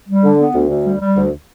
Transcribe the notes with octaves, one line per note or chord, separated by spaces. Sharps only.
G3
D3
B3
D2
D2
G3
G3
D2